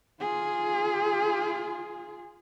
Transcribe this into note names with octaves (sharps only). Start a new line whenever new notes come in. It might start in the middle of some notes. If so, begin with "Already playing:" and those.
F4 G#4